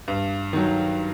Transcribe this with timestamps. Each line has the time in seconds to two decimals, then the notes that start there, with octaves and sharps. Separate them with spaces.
0.08 G2
0.53 D#3 F#3